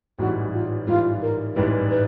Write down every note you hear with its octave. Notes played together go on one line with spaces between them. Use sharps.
A1 G#2 E3 G3 F#4
F4
A1 G#2 E3 G3 F4
A#4
A1 G#2 E3 G3 B4
B4